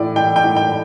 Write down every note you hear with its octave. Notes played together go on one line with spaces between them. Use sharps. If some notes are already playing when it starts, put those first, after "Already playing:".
Already playing: A2 E3 D5
E3 G5
G5
A2
G5